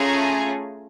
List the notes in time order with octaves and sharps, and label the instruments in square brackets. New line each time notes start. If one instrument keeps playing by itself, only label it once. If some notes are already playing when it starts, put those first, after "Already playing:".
Already playing: [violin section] A3 C#4 F4 G#4 G#5 A#5